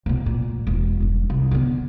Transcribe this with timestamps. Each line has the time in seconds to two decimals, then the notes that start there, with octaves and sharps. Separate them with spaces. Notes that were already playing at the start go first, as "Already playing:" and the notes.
0.06 D1 B2
0.26 A#2
0.67 E1
1.00 E1 G2
1.30 C2
1.51 D3 B3